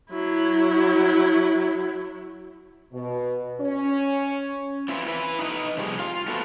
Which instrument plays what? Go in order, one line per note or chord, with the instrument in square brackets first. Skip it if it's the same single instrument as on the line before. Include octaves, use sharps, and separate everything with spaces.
[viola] F#3 E4
[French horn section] B2
C#4
[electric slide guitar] C4 E4 F4 B4
E4 B4
D#4 B4 D#5
C3 F3 G3 G#4
F4 F5
B3 E4 F#4 A4